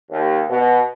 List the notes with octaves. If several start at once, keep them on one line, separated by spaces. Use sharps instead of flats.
D#2
B2